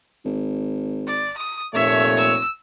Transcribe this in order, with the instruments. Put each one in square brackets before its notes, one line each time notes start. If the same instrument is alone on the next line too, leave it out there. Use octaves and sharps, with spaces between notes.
[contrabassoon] G#1
[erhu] D5
D#6
[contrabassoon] F1 [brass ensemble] A#2 A3 C#5 [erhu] E5
[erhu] E6